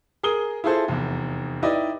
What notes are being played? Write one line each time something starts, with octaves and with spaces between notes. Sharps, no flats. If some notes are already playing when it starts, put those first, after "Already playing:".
G#4 A#4 D#6 G7
E4 F4 G#4 A4 C5
F1 E2
D#4 E4 G4 B4 D5 D#5